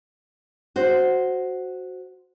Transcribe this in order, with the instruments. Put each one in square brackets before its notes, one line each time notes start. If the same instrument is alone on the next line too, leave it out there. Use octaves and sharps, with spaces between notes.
[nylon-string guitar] F#4 C5